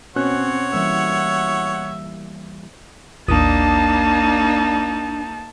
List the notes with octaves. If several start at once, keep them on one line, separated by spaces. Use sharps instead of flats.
B2 C4 C#4 C#5 F#5 F#6
E3 G3 A#3 E5
A1 D#2 A#3 D4 D#4 A5 D#6